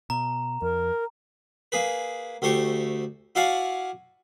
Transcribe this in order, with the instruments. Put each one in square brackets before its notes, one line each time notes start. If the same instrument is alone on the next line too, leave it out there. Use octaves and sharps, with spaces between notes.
[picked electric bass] B2 [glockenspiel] A#5
[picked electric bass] F2 [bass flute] A#4
[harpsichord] A#3 G#4 B4
D2 A3 G4 C5 C#6
E4 F#4 D5 F5 F#5 G#5